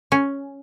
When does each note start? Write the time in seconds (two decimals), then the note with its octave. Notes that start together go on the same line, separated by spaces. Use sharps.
0.12 C#4